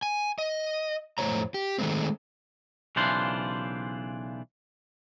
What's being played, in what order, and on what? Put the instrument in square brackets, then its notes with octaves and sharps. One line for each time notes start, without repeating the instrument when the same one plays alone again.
[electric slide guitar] G#5
D#5
F2 A2 D#4 C5 C#5 A#5
G4
D#3 G#3 A3 C4
[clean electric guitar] B1 C#3 E3 D4 F4 C5